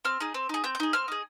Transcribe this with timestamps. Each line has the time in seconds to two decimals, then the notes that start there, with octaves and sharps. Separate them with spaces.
0.05 C4 F6
0.20 D#4 G#4
0.34 C4
0.49 D#4 G#4
0.64 C4 G6
0.75 G6
0.80 D#4 G#4
0.93 C4 F6
1.08 D#4 G#4